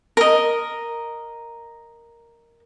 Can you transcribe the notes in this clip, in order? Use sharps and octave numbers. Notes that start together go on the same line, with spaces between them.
A#4 D#5